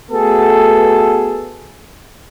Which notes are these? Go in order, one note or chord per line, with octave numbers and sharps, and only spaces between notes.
A3 B3 F#4 G#4 A4